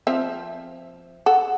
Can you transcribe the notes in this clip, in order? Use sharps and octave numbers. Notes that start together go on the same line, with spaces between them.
F3 C4 E5
A4 F#5